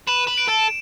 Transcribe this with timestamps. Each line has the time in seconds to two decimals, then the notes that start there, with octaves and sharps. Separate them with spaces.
0.07 B4 E7
0.27 B4
0.38 D7
0.48 A4